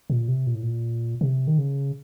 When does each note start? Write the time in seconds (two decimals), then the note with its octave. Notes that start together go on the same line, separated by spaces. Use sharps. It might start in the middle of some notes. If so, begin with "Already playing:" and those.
0.10 A#2
0.28 C3
0.47 A#2
0.55 A2
0.63 A#2
1.21 C3
1.47 D#3
1.58 C#3